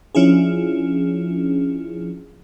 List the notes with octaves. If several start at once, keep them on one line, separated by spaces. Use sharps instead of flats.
F3 C#4 D4 E4 F4 G#4